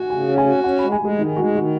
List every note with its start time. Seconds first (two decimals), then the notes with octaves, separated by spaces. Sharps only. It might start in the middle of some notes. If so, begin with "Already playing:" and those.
Already playing: F#4 F#5 G#5
0.10 C#3 G#5
0.28 C#4
0.38 G#5
0.46 F#4
0.64 C#4 F#5
0.78 G#3 B5
0.92 G#5
1.00 G#3 G#4
1.18 D#3 D#4
1.36 G#3 F#4
1.55 D#3 F#4